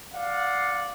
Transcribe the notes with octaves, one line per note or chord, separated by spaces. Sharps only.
D5 F5 F#5